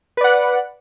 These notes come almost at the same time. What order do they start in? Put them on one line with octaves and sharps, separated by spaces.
B4 D5 F#5